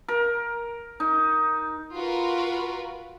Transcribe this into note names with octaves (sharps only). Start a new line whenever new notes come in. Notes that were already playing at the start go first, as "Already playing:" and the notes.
A#4
D#4
F4 F#4 A#4 B4